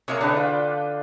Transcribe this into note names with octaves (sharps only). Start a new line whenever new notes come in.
C3 G#3 A#3 C#5 A#5 D#6
D3 D4 B4 G5
F4